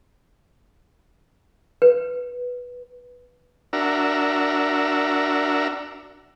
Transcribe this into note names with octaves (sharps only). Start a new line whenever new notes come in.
B4
D4 F#4 A#4 E5